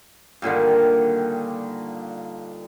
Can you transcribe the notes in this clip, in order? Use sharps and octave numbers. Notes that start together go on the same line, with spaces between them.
G2 A#2 D3 D#3